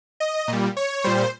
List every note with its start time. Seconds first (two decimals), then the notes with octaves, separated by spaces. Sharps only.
0.20 D#5
0.48 A#2 G3
0.77 C#5
1.04 A#2 G3 C5